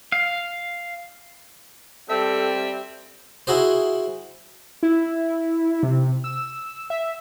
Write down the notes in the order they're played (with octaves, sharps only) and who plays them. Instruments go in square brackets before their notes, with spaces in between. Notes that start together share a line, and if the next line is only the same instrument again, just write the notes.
[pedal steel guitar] F5
[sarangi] G3 [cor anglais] C4 [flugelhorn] A4 [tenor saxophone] E5
[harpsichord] E4 F#4 G#4 C5
[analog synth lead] E4
C3
E6
E5